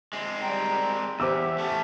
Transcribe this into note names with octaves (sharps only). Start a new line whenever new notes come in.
G#3 C4
G3 G5 A#5
E2 G4 C5 E5 D6 E6
A3 C#4